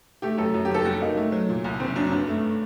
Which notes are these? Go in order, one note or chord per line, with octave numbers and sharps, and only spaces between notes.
A3 G4
F#2 A4
F#2
G4
F#1 A4
G3 F#4
A#3 D#4
A3
F#3
A#2
C2
F#1 C4
F#2 D4
G2
A3